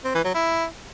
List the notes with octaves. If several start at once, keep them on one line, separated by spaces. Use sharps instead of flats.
C4
E3
F#3
E4